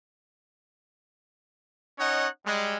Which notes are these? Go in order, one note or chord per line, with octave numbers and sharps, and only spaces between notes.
C#4 D#4 C#5 D#5 F#5
G3 G#3